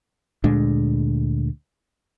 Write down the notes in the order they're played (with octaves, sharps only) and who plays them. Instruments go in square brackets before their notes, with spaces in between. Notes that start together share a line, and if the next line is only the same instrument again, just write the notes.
[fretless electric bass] D2 A#2 G#3 D4